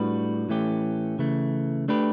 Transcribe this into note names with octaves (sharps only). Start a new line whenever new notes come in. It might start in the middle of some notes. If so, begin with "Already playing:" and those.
Already playing: A2 G3 D4 F#4 B4
A2 E3 A3 C#4 G4
C#3 E3 A3
A3 D4 G4 B4